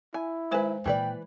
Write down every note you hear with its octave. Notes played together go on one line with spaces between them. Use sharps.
E4 G#5
D#3 G#3 B4 C5 G#5
A#2 D#3 E3 B4 D5 G5